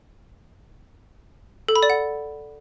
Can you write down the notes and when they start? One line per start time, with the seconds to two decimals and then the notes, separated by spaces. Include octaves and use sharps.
1.69 A4
1.76 B5
1.83 D5
1.90 F#5